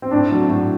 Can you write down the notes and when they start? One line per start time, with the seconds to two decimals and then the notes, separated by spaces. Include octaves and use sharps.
0.02 C4
0.11 A2 D4
0.30 F#3 A3
0.49 A2